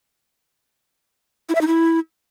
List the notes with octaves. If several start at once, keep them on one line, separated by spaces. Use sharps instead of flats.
E4
E5
D#4
E4